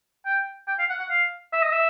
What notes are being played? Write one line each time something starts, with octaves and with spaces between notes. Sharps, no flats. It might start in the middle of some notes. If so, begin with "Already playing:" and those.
G5
G5
F5
F#5
F#5
F5
E5
D#5
E5